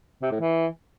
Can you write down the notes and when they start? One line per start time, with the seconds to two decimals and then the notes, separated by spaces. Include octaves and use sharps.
0.22 C3
0.31 A2
0.40 E3